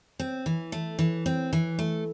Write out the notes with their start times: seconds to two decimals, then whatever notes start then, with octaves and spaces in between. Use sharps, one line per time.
0.20 C4
0.46 E3
0.72 A3
0.99 E3
1.26 C4
1.53 E3
1.79 A3